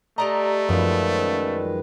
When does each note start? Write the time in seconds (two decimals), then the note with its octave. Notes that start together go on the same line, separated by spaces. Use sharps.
0.18 A3 G4 D5 D#5 A#5
0.69 F#2 D#3 F3 G#3 B3 B4 D5 F5